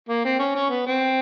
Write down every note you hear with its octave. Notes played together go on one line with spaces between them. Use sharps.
A#3
C4
C#4
C#4
B3
C4